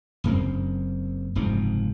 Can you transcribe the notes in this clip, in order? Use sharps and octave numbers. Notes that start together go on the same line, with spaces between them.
F#1 F#2 A#3 C4
F#1 G#2 C3 F3